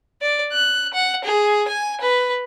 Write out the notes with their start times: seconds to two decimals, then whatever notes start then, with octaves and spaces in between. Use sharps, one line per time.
0.22 D5
0.53 F#6
0.94 F#5
1.25 G#4
1.68 G#5
2.01 B4